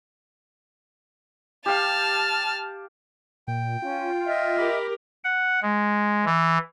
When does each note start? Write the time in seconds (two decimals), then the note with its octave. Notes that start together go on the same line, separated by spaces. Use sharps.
1.66 G4 F5 A5 F6
3.48 A#2 G5
3.82 C#4 F4
4.26 D#5 E5 F6
4.58 G4 A#4 B5 D6
5.24 F#5
5.62 G#3
6.25 E3